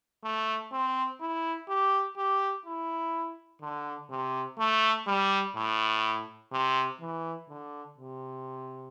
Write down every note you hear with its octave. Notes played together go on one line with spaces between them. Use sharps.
A3
C4
E4
G4
G4
E4
D3
C3
A3
G3
A2
C3
E3
D3
C3